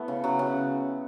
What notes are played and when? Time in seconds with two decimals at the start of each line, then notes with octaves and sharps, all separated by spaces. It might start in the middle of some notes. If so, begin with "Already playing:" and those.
Already playing: A3 B3 E4
0.08 C#3
0.24 F#3
0.39 C#3